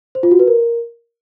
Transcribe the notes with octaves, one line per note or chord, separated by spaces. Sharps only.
C5
F4
F#4
B4
A#4